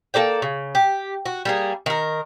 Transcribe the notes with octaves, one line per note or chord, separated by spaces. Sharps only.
A#3 A4 D5 G5
C#3
G4
F#4
G3 A#3 G#4
D#3 A#4